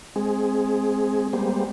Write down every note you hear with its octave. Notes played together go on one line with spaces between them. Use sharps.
G#3 C4 G#4
G3 G#3 A#3 B3 G4 C5